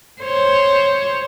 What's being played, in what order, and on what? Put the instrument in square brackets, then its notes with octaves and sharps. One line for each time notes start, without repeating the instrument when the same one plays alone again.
[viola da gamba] C5 C#5